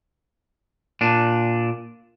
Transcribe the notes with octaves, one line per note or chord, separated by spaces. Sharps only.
A#2 D4